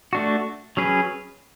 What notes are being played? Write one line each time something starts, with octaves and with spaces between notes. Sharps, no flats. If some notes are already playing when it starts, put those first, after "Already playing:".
A3 D4 F#4
F#3 C#4 G#4 B4